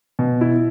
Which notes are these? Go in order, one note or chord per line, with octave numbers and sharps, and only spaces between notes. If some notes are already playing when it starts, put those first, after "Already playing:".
B2
E4